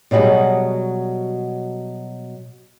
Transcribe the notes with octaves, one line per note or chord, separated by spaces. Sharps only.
B2 F#3 G3 F#4 G#4